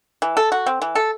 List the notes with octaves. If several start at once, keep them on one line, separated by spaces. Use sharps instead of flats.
E3
A4
F#4
C4
E3
A4